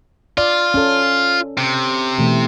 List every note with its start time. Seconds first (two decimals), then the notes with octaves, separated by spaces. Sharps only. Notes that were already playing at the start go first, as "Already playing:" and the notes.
0.38 F4 D5
0.74 C#4 A4
1.58 C3
2.18 B2 E3 A3